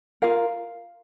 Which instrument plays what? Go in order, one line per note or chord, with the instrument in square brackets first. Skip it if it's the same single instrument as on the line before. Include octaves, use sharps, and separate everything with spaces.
[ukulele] F4 A#4 F5